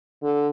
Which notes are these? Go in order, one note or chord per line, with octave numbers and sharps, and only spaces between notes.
D3